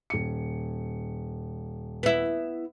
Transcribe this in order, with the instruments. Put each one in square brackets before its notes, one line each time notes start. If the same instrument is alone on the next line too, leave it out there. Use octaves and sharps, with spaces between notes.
[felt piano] D#1 C#7
[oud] B3 E4